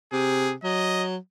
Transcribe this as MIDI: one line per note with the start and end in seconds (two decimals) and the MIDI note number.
0.13 0.55 48
0.13 0.53 68
0.64 1.17 54
0.64 1.04 75